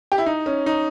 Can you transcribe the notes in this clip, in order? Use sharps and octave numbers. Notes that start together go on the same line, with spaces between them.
G4
E4
D#4
C#4
D#4